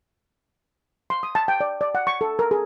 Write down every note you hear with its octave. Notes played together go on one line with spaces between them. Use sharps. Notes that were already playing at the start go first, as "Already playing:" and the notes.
C6
D#6
A5
G5
D5
D5
F#5
C#6
A4
A#4
G#4